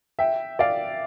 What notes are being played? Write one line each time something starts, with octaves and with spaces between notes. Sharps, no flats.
E5 G5
D5 F5